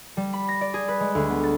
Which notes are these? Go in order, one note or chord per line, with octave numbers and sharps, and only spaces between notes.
G3
B5
A#6
D5
G#4
B4
G#3
D2
B3
A6